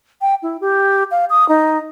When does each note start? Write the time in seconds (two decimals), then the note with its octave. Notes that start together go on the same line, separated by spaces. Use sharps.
0.21 G5
0.43 E4
0.61 G4
1.11 F5
1.30 D#6
1.49 D#4